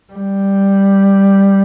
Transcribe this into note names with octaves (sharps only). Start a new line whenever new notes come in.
G3